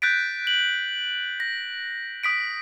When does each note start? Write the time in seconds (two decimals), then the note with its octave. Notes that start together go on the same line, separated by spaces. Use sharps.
0.02 F#6 G6 A6 B6 D7
0.47 F#7
1.40 A#6
2.23 D#6 B6 D7